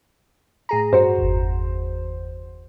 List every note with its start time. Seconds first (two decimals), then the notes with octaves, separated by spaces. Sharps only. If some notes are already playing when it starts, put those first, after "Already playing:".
0.69 A2 G#4 A#5
0.93 G2 F#4 C5
1.18 G1 E2